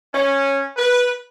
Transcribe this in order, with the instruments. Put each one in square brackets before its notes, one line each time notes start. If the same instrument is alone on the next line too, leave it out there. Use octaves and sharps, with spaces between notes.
[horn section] C#4
B4